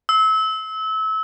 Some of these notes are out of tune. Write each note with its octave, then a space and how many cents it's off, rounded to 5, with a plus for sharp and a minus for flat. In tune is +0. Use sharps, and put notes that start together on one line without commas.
E6 -30